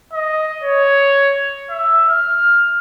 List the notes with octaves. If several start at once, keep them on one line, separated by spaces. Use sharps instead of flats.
D#5
C#5
E5
F6